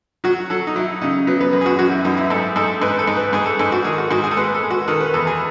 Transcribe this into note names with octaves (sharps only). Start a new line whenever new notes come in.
F#3 F#4
F#3 A4
D#4
F#3 E4
C#3 D#4
F#3 B3
B3
F#2
G#4
F#4
F#2 F#4
E4
F#2 D#4
E4
G#2 A4
G#2 A4
G#2 B4
A4
G#2
B4
G#2 G#4
A4
G#2 A4
F#4
D#3 G#4
F#4
G#2 F#4
G#4
A4
G#3 B4
A4
G#3
F#4
D#3 A4
B4
E2 A4
G#4